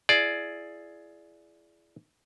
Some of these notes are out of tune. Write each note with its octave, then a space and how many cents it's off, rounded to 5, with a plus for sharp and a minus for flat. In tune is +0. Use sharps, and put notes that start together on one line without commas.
E4 +30 G#4 +15 D5 +0